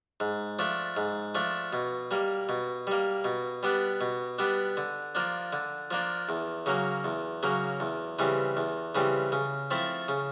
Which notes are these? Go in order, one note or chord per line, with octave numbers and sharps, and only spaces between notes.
G#2
F3 A3 D4
G#2
F3 A3 D4
B2
G3 A#3
B2
G3 A#3
B2
G3 B3 D4
B2
G3 B3 D4
D3
F3 A#3 D4
D3
F3 A#3 D4
E2
C#3 F#3 A#3
E2
C#3 F#3 A#3
E2
C#3 E3 G3 C4
E2
C#3 E3 G3 C4
C#3
F3 A3 C4 E4
C#3